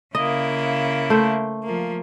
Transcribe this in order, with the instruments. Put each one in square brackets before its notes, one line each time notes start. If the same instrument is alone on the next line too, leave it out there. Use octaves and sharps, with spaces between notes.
[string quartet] C#3 A#3 E4 [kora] D#5
[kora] A3 C5
[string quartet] F3 A#3